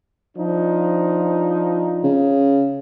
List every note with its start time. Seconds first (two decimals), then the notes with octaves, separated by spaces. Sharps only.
0.37 F3 D4 D#4
2.04 C#3